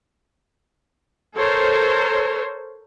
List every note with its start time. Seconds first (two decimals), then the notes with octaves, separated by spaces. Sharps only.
1.35 A4 A#4 C5 C#5